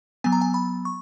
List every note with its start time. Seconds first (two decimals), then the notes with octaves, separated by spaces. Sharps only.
0.24 F#3 B3 G#5
0.32 A#5
0.41 G#5
0.54 B5
0.85 C#6